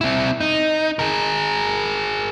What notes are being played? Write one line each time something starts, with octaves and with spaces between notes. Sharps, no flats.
C4 E4
D#4
G#4 A#4